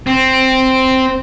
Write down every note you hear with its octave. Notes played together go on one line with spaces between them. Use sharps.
C4